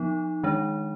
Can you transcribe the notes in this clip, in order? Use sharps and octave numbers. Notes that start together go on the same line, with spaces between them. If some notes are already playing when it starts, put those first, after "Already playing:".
Already playing: F3 B3 D#4
D#3 G#3 D4